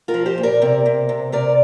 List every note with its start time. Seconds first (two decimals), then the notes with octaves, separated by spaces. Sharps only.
0.08 F4 A#4
0.14 F3
0.26 G4 C5
0.38 A#2
0.43 A#4 D5
0.62 C3
0.86 C3
1.09 C3
1.32 C3 A#4 D5